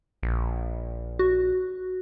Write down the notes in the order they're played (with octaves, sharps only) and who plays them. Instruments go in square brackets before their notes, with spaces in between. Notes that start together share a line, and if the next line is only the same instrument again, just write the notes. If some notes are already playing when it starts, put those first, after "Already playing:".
[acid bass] A#1
[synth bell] F#4